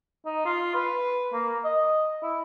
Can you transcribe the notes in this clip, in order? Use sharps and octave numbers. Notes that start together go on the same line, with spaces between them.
D#4
F4
B4
A#3
D#5
E4